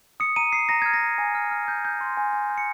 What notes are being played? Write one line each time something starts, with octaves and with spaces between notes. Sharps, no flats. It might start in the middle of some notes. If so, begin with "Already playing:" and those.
D#6 C#7
A#5 D#7
D#6 C7
A#5 A#6
F6 G#6
A#6
A#5
G#5
F6
F6
G6
G6
C6
G#5
G#5
G6
C#7